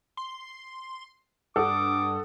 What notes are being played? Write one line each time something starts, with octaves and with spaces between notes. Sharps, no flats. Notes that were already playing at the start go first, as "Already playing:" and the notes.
C6
G2 A4 F#5 D6 D#6